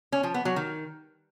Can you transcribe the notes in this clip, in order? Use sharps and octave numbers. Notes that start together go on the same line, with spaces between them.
C#4
F3
B3
F#3
D#3